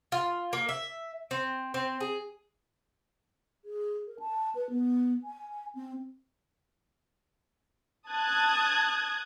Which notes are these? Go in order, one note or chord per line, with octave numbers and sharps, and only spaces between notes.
F4
A#3
E5
C4
C4
G#4
G#4
A#4
A5
B4
B3
G#5
C4
A5 D#6 F#6 G#6